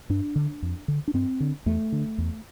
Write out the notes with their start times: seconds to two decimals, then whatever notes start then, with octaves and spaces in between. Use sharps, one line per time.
0.10 G2 D4
0.36 D3
0.62 F2
0.88 D3
1.08 D4
1.14 G2 C4
1.40 D3
1.66 E2 A3
1.92 D3
2.18 E2